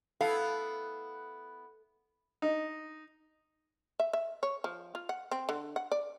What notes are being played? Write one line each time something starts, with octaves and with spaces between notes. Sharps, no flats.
B3 E4 A4 F5
D#4
E5
E5
C#5
F3
F4
F#5
C4
D3
F#5
D5